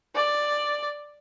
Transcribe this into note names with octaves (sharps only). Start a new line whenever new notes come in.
D5